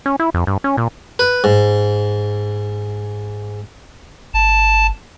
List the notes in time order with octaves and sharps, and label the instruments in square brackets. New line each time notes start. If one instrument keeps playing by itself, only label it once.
[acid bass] C#4
E4
F2
G2
C#4
A#2
[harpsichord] B4
G#2
[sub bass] G1 [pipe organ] A5